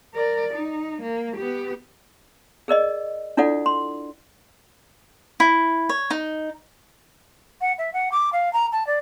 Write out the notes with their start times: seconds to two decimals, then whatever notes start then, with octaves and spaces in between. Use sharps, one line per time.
0.14 A#4 D5
0.54 D#4
1.02 A#3
1.37 B3 G4
2.68 G#4 A#4 D5 D#5
3.37 D4 E4 F4 A4 D5 F#5
3.66 C6
5.40 E4
5.89 C#5
6.10 D#4
7.61 F#5
7.78 E5
7.93 F#5
8.12 D6
8.32 F5
8.53 A#5
8.72 A5
8.87 D5